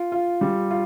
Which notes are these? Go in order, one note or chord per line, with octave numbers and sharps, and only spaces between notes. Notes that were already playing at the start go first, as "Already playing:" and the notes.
Already playing: F4
F4
G3
F4